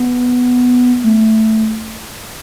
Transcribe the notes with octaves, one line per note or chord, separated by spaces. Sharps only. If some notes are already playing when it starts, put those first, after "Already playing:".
Already playing: B3
A3